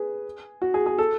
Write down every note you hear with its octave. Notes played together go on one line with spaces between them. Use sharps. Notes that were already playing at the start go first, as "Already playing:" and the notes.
Already playing: G#4 B4
F#4
G#4
G#4
A4